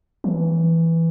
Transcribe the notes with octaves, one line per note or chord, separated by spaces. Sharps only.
E3